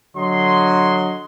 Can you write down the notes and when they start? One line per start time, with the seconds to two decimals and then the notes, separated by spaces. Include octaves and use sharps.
0.16 D3 F#3 D#5 C6